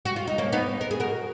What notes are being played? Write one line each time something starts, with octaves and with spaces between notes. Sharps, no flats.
F#4
F4
D#4
A#3 C#4
B3 D#4
A#4
G#4
F#4 A#4